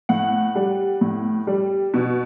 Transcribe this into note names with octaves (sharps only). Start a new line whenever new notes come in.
A2 F#5
G3
A2
G3
B2